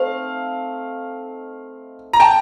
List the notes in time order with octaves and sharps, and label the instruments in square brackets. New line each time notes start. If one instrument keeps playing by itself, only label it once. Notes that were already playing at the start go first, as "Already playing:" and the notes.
Already playing: [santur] A3 C4 D#4 [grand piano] F5
[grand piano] A#5
G5 A5